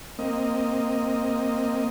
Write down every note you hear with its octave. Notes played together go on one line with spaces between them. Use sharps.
A#3 C4 D#5